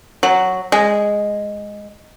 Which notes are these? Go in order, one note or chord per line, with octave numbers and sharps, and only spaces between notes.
F#3
G#3